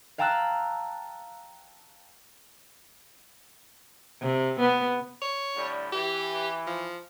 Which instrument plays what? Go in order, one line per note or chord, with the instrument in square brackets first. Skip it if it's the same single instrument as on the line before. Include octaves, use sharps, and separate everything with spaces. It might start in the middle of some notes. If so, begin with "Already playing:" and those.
[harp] F5 G5 A5 A#5 E6 F#6
[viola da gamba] C3
B3
[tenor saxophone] C#5
[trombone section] A2 D3 G3
[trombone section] E3 [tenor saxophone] G4
[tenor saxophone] F3